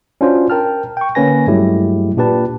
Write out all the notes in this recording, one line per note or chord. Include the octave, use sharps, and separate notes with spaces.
C#4 D4 F4 F#4 C5
A#4 G5 A5 F6
G5 C#6
D3 A#3 C#4 B4 G#5 A#6
G2 F#3 G#3 A3 E4 G4
A#2 D4 G4 B4 A5